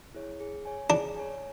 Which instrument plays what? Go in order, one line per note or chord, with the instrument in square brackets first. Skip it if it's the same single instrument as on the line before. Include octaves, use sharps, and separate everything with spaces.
[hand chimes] E4 G#4 C#5
G#4
C#5 G#5
[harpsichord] D4 [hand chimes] G#4
[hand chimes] C#5 G#5